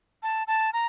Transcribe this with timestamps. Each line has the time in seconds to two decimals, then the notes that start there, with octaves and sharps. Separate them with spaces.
0.23 A5
0.47 A5
0.73 A#5